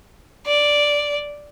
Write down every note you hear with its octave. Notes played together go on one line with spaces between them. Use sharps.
D5